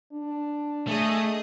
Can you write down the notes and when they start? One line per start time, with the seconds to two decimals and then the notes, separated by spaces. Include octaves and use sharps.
0.13 D4
0.87 A3 G#4 D#5 D#6